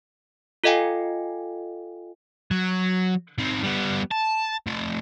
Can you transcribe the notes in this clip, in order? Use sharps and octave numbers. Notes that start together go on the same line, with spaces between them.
F4 A4 D#5 F5 G5 G#5
F#3
D#3 C4
G3 B3
A5
F3 A3